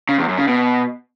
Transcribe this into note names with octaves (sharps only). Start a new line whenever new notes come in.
C#3
E2
F#2
C#3
B2